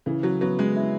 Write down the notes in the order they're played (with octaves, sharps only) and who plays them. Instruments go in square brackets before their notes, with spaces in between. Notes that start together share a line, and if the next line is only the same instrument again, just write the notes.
[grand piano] C#3 [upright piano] E3
[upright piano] F#3
[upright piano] F#3 [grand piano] B3
[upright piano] G#3
[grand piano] E4